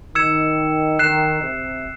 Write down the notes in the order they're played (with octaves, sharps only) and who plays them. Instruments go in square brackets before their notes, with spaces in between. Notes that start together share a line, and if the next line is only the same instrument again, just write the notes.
[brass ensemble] D#3 [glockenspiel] E6 G#6 C#7 E7
[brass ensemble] D#3 [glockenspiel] F#6 C7 E7
[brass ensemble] C3